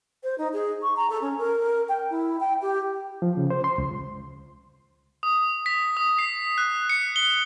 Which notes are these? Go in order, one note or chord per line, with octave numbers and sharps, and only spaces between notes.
C5
D#4
G#4
C#6
A#5
A4
C#4
A#4
G5
E4
G5
G4
F3
C#3
C5
C6
C#2
D#6
B6
D#6
C7
F#6
C#7
G7